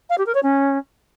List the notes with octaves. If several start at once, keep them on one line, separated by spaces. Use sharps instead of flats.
F5
G4
A#4
C#5
C#4